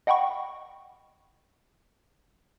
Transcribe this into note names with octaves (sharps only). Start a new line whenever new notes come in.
D#5 F#5 G5 B5 C#6